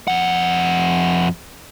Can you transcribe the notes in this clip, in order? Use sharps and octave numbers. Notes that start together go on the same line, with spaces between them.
F2 F#5